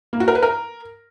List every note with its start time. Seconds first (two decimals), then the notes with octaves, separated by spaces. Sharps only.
0.13 A#3
0.20 F#4
0.28 A#4
0.35 B4
0.42 A#4